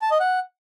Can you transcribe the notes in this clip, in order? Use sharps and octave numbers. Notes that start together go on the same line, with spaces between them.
A5
D#5
F#5